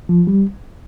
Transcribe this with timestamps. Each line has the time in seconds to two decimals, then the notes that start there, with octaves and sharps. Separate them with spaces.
0.09 F3
0.27 G3